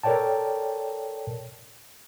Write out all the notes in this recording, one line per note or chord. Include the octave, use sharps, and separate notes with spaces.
A4 A#4 C#5 D5 G5 A5